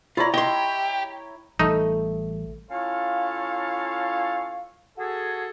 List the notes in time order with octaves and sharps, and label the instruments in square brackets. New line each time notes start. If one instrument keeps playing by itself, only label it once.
[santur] E4 C#5 A#5 [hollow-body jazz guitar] F4 D5
[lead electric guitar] G4 [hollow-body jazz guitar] D#5 C6
[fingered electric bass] A1 E3 G3 [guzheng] A3 [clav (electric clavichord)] D#4
[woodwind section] C#4 E4 F4 A4 C#5 F5
F#4 G#4 A4